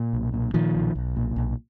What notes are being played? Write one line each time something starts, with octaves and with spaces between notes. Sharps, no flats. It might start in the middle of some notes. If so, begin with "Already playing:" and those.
Already playing: A#2
B1
A#2
A#2 D#3 F3
B1
B1
A#2
B1